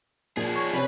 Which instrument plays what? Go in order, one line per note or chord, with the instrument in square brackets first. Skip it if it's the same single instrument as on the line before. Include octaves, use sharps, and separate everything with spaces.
[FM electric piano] A#2 [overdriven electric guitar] F3 G#4
[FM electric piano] C#5
[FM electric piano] C3 C#4 [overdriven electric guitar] B4